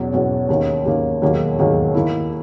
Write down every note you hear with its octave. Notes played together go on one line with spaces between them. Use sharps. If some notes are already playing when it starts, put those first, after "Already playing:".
Already playing: E2 B2 F#3 C#4
E2 B2 F#3 C#4
D#2 D#3 A#3 C#4
D#2 D#3 A#3 C#4
E1 D#2 D#3 F#3 A#3
E1 D#2 D#3 F#3 A#3
D#3 A#3 E4